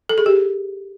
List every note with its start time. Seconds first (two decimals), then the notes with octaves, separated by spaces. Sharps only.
0.09 A4
0.18 G#4
0.26 G4